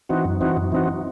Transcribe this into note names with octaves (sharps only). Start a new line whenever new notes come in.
E3 C4 D#4 F#4
F#2
E3 C4 D#4 F#4
F#2
E3 C4 D#4 F#4